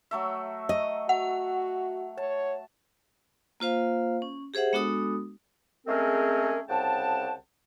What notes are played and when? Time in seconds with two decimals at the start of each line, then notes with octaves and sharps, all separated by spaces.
0.11 F#3 A3 E5
0.69 D#5
1.09 F#4 F#5
2.18 C#5 A5
3.60 A#3 F4 C5 F5
4.22 C#4
4.54 G4 G#4 C5 E5 F#5
4.73 G#3 B3 D4 F#4 A4 D#6
5.87 G#3 A3 C4 C#4 G#4 A#4
6.69 C2 C#3 F#5 G5 A5